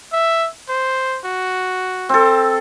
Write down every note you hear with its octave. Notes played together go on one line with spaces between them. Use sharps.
E5
C5
F#4
C4 A4